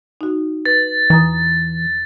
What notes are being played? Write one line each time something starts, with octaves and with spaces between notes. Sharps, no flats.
D#4 F#4
B4 A6
E2 E3 A#5 D#6